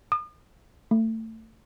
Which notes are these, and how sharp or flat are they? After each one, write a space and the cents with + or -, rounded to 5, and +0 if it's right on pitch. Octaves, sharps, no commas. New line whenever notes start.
D#6 -40
A3 +25